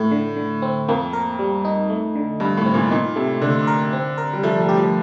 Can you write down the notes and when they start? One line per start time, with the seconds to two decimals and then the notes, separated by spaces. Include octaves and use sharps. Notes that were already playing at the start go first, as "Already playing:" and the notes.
Already playing: A2 A3
0.11 D3
0.37 D3
0.62 C4
0.88 F2 A#3
1.13 A#4
1.39 G3
1.65 D#4
1.90 A3
2.15 D3
2.40 G2 D3
2.57 A2
2.66 C4
2.74 A#2
2.91 A#2 D#4
3.16 C3 A3
3.42 D3 A3
3.67 A#4
3.93 C4
4.18 A#4
4.33 G3
4.43 F3 A3
4.61 G3
4.69 G4
4.77 F3